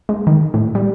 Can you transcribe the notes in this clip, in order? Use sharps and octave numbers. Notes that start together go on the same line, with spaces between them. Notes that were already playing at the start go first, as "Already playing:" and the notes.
G#3
D#3
A2
G3